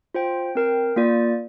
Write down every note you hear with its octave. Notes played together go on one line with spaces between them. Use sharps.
F4 C5 G5
C4 A#4 G5
A#3 F4 D5